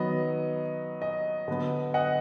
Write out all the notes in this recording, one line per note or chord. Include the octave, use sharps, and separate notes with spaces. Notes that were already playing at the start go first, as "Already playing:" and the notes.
Already playing: D#3 F#3 B3 D#5
D#5
D3 F#3 B3
D#5 F#5